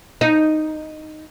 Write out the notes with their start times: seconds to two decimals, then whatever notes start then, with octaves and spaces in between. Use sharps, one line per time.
0.21 D#4